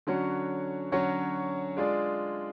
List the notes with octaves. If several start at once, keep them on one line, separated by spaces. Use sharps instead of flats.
D3 F#3 C#4 F#4 C#5
D3 F#3 C#4 F#4 C#5
G#3 D4 F4 G#4 D5